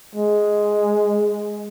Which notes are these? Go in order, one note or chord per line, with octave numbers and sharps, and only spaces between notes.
G#3